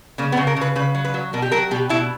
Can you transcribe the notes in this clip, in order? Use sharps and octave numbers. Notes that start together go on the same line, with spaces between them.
C#3 A#3
B3
C#3
A#4
C#3 B4
C#3 B4
F#3
B4
F#3
B2 A#4
G4
F#3 A#4
B2 G4
B2 E4